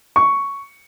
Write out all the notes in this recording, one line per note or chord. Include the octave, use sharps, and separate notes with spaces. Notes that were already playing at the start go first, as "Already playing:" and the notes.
C#6